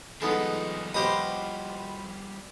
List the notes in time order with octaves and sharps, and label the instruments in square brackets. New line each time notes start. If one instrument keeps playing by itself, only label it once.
[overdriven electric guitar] F3 G3 [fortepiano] G#3 B3 D#4 [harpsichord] A4
[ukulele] F#4 G4 D#5 [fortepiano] B4 [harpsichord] C5 F5 D#6